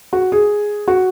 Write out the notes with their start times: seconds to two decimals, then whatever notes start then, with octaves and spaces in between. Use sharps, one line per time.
0.13 F#4
0.32 G#4
0.88 F#4